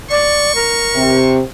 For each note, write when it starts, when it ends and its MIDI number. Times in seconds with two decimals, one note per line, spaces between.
0.10 0.52 74
0.10 1.38 85
0.55 1.17 70
0.95 1.40 48